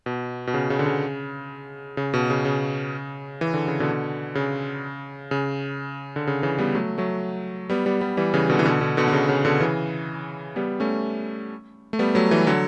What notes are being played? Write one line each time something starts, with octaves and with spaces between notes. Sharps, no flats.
B2
B2
C#3
C#3
D3
C#3
C#3
B2
C#3
C#3
E3
D3
C#3
B2 D3
C#3
C#3
D3
C#3
C#3 E3
G3 B3
F#3 A3
F#3 A3
G3 B3
G3 B3
G3 B3
E3 G3
C#3 E3
B2 D3
E3
B2 D3
B2 D3
B2 D3
D3
C#3
C#3
B2 D3
C#3 E3
G3 B3
A3 C#4
A3
G3 B3
F#3 A3
E3 G3
D3 F#3